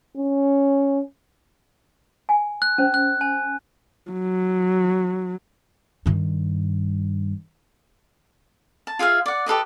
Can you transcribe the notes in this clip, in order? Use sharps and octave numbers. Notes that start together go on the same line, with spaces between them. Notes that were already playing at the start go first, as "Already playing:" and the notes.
C#4
G#5
F#6
C#4 C5
F#6
G#5
F#3
G2 D#3
A5
F4 G#4 E5 F5
D5 F#5
G4 A4 B4 D#5